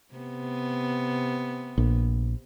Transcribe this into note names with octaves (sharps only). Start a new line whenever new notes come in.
C3 B3
A#1